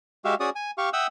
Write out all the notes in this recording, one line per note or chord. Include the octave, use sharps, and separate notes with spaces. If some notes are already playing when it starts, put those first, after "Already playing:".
G#3 F#4 G4 E5 F5
C#4 F#4 G#4 D5 D#6
G#5
G4 F5 C#6
E5 F#5 G5 D#6 E6